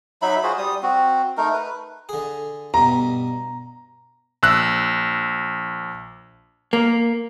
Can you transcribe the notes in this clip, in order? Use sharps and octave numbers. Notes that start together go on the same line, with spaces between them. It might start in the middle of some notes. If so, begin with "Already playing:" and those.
F#3 D#4 E5 B5
F4 F#4 G#4 C5
G3 D#6
C4 F#4
A3 D#4 A#4
B4
D3 G#4
G2 B2 A#5
A#1 E6 F#6
A#3